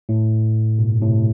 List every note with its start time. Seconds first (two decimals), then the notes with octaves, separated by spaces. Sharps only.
0.09 A2
0.78 G2 B2
1.01 A2 C3